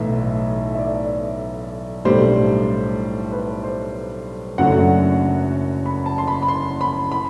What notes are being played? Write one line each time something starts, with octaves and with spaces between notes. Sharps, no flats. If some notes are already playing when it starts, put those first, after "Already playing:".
Already playing: B1 A2 E3 E5
E5
D5
B1 A2 G3 D4 C5
B4
C5
F#1 F#2 F#3 A3 D4 F#5
B5
A5
C6
B5
B5
C6
B5
B5